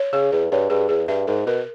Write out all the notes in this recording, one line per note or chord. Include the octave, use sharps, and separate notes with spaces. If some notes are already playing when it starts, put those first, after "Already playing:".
Already playing: C#5
C#3 G#4
E2 G#4
G2 C#5
G2 G#4
E2 G#4
G2 E5
G#2 A#4
B2 A#4